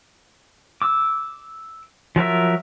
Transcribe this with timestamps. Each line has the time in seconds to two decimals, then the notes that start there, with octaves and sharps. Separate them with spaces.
0.82 D6 E6
2.16 F3 F#3 A#4 E5